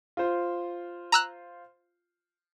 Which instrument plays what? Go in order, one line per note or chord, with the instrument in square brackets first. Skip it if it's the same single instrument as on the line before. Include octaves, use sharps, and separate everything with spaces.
[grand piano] F4 C5
[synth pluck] A#5 E6 F#6